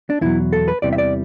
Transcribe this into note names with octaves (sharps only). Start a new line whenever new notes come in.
D4
E2 B2 F#3 E4
A4
B4
E2 C3 E3 G3 D5
E5
D5